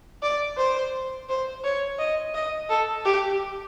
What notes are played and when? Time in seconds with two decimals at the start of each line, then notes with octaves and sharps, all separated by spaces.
0.22 D5
0.57 C5
1.29 C5
1.64 C#5
1.99 D#5
2.34 D#5
2.69 A4
3.05 G4